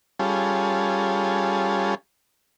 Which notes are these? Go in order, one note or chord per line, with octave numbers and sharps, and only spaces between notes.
G3 C#4 F4 G#4 A4